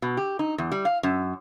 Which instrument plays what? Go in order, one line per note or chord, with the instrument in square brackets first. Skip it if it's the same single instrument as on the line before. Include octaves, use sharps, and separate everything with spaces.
[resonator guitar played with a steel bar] B2
G4
D#4
E2
G3
F5
F#2